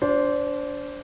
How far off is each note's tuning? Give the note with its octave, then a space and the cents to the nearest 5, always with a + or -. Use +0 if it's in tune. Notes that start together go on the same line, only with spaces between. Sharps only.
D4 -25 C5 +0